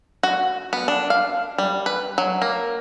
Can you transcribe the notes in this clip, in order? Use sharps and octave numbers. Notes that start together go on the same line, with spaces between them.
F#4
B3
D4
F5
G3
B4
F#3
A#3